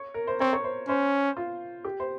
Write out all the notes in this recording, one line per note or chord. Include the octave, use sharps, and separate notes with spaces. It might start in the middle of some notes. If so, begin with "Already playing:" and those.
Already playing: C#5
A#4
C5
C4 C#5
C#5
C5
C#4 C5
F4
G4
C5